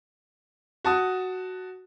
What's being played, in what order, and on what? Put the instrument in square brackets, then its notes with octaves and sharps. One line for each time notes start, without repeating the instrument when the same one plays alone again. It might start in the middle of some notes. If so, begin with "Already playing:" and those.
[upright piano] F#4 A5 D#6